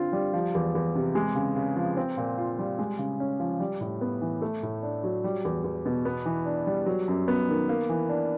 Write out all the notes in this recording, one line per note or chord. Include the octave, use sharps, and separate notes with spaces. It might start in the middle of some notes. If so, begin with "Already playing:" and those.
Already playing: D3 C4 F4
G3
F3
E2
E2
C3
G#3
C#3
C#3
F3
C4
A#2
F4
G3
G#3
C#3
C#4
F3
G3
A2
B3
E3
A3
A2
D4
F#3
G3
E2
E2
B2
B3
E3
D4
G3
F#3
F#2
B3
D#3
A#3
E3
D4